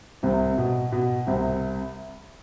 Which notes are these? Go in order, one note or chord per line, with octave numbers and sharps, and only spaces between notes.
C2 C3
B2
B2
C2 C3